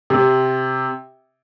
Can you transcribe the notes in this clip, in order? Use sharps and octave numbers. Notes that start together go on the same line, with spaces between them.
C3